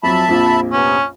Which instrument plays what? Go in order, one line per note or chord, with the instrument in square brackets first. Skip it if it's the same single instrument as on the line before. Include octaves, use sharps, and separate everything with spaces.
[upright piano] F2 F#3 [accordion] E5 A5 B5
[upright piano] A#1 F2
[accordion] C3 B3 [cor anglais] C#4